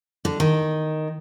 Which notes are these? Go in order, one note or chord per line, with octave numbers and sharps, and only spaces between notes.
D3
D#3